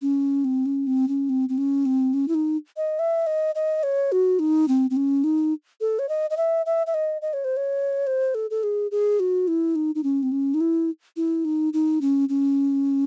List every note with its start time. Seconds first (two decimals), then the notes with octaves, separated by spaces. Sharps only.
0.02 C#4
0.44 C4
0.66 C#4
0.87 C4
1.08 C#4
1.29 C4
1.49 C4
1.58 C#4
1.86 C4
2.13 C#4
2.28 E4
2.34 D#4
2.77 D#5
2.99 E5
3.27 D#5
3.55 D#5
3.83 C#5
4.12 F#4
4.39 D#4
4.68 C4
4.90 C4
4.96 C#4
5.24 D#4
5.81 A4
5.99 C#5
6.09 D#5
6.30 D#5
6.37 E5
6.66 E5
6.87 E5
6.94 D#5
7.22 D#5
7.33 C#5
7.44 C5
7.57 C#5
8.07 C5
8.35 A4
8.50 A4
8.63 G#4
8.91 G#4
9.20 F#4
9.48 E4
9.75 D#4
9.95 D#4
10.03 C#4
10.23 C4
10.32 C#4
10.54 D#4
10.61 E4
11.16 E4
11.45 D#4
11.73 D#4
12.01 C#4
12.29 C#4